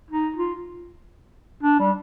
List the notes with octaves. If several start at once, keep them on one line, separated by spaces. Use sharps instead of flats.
D#4
F4
D4
G3